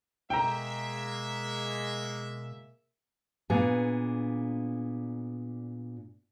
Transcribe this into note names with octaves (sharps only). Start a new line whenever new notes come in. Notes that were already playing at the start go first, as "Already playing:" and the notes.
B2 G#3 A#3 E5 G5 A#5
A#2 B3 D4 G#4